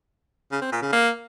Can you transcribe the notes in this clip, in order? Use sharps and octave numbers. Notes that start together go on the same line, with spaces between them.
C#3
C4
A#2
C#3
A#3